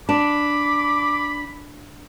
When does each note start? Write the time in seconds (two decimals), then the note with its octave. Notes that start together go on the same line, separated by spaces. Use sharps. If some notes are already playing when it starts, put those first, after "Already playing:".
0.09 D4 B5 D6